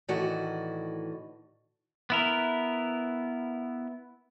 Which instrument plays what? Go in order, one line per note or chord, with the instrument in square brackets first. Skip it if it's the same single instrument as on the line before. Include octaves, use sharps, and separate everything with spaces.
[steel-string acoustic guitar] A2 D#3 E3 F#4 D5 F#5
[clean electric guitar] B3 E4 A#4